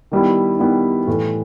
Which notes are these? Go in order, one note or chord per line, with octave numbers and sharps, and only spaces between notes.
D#3 G3 B3 E4
D#3 G3 B3 E4
A2 E3 A3